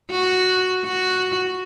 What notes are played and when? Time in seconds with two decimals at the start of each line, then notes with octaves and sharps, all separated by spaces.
0.11 F#4
0.85 F#4